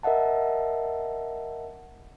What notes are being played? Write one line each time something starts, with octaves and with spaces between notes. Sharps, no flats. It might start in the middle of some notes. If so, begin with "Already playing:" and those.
A#4 D#5 E5 F#5 A5